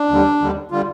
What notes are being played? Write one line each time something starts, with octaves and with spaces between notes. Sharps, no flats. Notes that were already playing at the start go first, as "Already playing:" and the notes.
Already playing: D4
D#2 D3 G3
D#2 D3 G3
D3 G3 F4